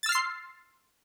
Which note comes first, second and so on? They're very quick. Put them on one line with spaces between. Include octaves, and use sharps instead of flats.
A6 E6 F6 C7 C6